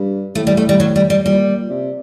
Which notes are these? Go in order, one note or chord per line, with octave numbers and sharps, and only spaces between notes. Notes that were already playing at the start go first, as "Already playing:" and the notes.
Already playing: G2
A2 A3
G3
A3
G3
F#3
G3
G3
A#2 G3
C3